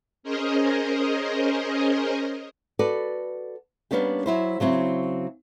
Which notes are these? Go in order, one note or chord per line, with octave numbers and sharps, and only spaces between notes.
C#4 G#4 A#4 C5 D#5
F#4 A4 B4 D5
G3 A#3 B3 C#4 D4 G4
F#3 E4 C5
C#3 F#3 C4 E4